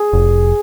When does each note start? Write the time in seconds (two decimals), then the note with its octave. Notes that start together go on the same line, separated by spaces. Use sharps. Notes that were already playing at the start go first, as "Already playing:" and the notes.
Already playing: G#4
0.13 F1